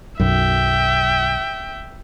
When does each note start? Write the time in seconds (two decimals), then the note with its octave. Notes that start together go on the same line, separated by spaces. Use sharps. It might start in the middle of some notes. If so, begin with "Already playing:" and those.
0.20 B1 F#2 E5 G5